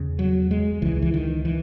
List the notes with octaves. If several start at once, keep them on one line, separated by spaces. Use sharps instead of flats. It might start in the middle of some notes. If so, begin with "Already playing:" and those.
Already playing: E2 C#3
F#3
G#3
C#2 C#3 E3
E3
D#3
E3